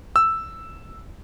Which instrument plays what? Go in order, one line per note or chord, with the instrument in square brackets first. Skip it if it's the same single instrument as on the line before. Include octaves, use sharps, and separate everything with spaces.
[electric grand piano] E6